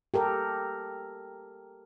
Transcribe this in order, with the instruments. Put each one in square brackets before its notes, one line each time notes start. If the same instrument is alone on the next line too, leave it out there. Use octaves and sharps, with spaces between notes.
[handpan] G4 A4 A#4